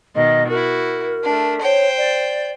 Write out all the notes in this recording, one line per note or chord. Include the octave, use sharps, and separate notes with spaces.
B2 D#3 D#5
E4 F#4 A#4
A3 D4
C5 C#5 G5
D5